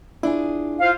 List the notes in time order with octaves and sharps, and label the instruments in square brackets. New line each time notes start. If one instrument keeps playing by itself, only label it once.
[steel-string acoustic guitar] D4 F4 G#4 [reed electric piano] E4
[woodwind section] F4 C5 F5